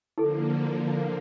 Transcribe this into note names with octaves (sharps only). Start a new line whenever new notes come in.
D3 F3 A#3 E4 A4